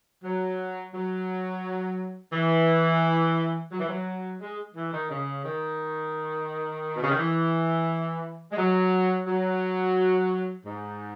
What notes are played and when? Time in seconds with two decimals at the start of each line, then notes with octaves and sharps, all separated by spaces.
0.24 F#3
0.94 F#3
2.33 E3
3.72 F#3
3.79 E3
3.89 F#3
4.41 G#3
4.75 E3
4.93 D#3
5.10 C#3
5.45 D#3
6.96 B2
7.03 C#3
7.11 D#3
7.19 E3
8.52 G#3
8.58 F#3
9.27 F#3
10.66 G#2